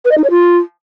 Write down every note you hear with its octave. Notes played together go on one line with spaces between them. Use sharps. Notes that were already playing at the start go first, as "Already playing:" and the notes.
B4
D#5
D#4
C#5
F4